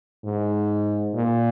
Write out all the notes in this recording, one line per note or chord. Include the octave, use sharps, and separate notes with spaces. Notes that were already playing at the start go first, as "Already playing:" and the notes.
G#2
A#2